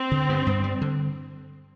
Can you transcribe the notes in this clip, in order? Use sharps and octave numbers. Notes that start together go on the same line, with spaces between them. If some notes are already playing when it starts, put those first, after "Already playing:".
Already playing: C4
D3
G2
G2
G3
D3